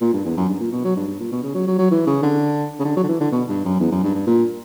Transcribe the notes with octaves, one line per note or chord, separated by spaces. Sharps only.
A#2
G2
E2
F#2
G2
A#2
B2
F#3
G2
G2
A#2
B2
C#3
F#3
F#3
F#3
E3
C#3
D3
C#3
D3
F#3
D3
E3
D3
B2
G2
F#2
E2
F#2
G2
G2
A#2